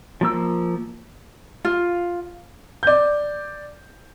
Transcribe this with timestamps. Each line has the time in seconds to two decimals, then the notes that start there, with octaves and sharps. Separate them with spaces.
0.21 F3 A#3 E6
1.65 F4
2.83 D5 G6